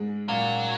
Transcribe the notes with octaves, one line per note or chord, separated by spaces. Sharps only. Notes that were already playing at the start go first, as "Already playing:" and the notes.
Already playing: G#2 G#3
A#2 F#3 A#3